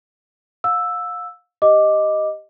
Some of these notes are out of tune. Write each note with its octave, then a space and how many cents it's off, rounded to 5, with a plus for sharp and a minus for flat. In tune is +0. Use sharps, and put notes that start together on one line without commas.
F5 +35 E6 +0
G4 +0 D#5 +0 D6 +0